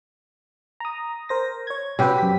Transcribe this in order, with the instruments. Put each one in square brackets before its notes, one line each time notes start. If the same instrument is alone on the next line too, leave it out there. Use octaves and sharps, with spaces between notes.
[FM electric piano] A#5 D#6
A#4 C5 A#6
C#5 G#6
[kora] C3 G4 [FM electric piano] C#4 F#4 B4
[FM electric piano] F#2 B6